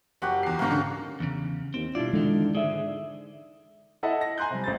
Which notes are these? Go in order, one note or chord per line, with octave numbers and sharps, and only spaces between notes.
F#1 F#4 G4 F#5
E2 C7
C2 G#2 A#3 F#4 G5
D3 C#4
E2 C#3
D#2 C4
G2 B2 D4 E4 F4 D5
E2 D3 D#3 G#3 D#4
G#2 D3 G#4 D5 E5
E4 A4 D#5 E5 F#5 A5
A#6
G#5 A#5 C6 F#6 G6
C3 G3
A1 C5 A6